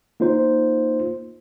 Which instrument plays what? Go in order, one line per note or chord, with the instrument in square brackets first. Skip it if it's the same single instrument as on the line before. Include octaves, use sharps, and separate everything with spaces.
[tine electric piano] A#3 D#4 F4 C5